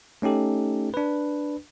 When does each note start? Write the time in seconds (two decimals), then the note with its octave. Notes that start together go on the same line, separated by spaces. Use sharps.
0.22 A3 C#4 D#4 G4 A4
0.94 D4 B4